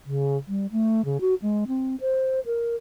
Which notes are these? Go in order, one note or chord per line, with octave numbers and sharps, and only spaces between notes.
C#3
G3
A3
C#3
F#4
G#3
C4
C5
A#4